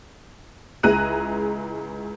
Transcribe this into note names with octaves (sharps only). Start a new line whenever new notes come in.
C#2 E4 G#4 A#5 F#6 D#7